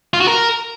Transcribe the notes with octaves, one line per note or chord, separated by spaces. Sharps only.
F4
F#4
A#4